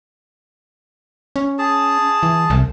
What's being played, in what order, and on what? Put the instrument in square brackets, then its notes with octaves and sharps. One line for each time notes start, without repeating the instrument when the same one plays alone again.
[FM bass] C#4
[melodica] G#4 A5
[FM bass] E3
C2